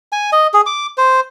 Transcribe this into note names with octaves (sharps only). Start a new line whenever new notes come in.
G#5
D#5
G#4
D6
C5